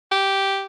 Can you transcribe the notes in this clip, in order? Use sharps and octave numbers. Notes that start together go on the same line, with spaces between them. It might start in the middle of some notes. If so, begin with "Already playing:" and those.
G4